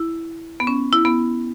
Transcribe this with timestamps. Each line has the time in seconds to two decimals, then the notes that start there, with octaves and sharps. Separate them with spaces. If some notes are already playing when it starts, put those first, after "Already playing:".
Already playing: E4
0.60 B3
0.67 C#4
0.93 E4
1.05 B3